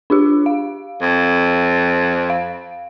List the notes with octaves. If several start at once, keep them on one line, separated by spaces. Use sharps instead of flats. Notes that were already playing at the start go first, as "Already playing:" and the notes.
D4 F4 G4
F5
F2
F5